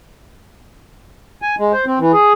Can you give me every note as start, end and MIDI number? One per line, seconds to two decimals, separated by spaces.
1.42 1.55 80
1.59 1.72 56
1.73 1.85 72
1.87 1.99 60
1.99 2.12 52
2.13 2.33 68